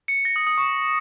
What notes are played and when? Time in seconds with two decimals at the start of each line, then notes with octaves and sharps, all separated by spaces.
0.08 C#7
0.25 A#6
0.36 D#6
0.47 D#6
0.58 C#6